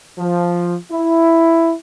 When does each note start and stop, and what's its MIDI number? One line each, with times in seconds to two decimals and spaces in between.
0.18 0.77 53
0.91 1.73 64